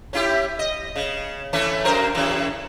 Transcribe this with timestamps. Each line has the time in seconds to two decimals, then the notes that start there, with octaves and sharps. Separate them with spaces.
0.13 C#4 E4 G4
0.59 D#5
0.96 C#3
1.53 E3 A3 C#4
1.85 F#2 A#4 C5
2.15 F#2 C#3 E3